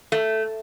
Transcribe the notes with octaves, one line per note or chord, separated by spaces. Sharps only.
A3